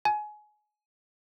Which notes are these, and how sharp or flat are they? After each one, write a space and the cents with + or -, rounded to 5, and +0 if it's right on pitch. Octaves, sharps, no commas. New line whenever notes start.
G#5 +25